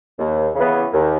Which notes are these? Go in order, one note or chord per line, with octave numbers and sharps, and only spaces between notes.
D#2
C#3 E3 B3
D#2